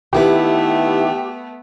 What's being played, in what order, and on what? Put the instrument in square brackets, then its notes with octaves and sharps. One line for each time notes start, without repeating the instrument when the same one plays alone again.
[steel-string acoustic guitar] D#3 E4 B4 [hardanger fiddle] A3 B3 [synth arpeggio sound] G4